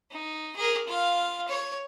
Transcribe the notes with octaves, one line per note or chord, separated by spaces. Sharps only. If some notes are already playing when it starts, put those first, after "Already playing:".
D#4
G#4 A#4
F4 F5
C#5